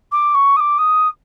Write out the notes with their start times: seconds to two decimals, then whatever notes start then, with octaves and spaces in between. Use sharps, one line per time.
0.12 D6
0.34 C#6
0.56 D#6
0.60 D6
0.78 D#6